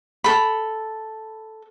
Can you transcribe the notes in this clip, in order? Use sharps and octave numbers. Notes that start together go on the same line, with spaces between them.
A4 B5